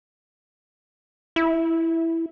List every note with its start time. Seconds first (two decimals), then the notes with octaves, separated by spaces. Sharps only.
1.36 E4